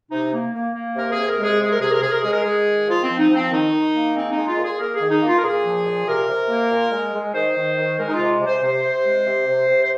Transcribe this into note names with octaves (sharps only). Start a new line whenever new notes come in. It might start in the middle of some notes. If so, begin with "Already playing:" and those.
C3 D#4
A#3
A#3
A#3
C3 A#4
C3 G#4
A#4
G#3 G#4
C3 G#4
A#4
C3 G#4
A#4
C3 G#4
A#4
G#3 G#4
A#4
G#3 G#4
D#3
F3 F4
F3 C4
D#4
F3
C4
D#3 D#4
D#3
A#3
G#3 C4
D#4
G#3
F4
A#2
G#4
A#3 A#4
G#4
D#3
D#4
A#3
F4
A#4
A#2 G#4
F3
A#2
C3 A#4
C3
A#3
A#2
G#3
G#3
D#3 C5
D#3
D#3
G#3 A#4
D#4
F4
C3
C3
C5
C3 C5
C3
G#3
C3
C3
C3
C5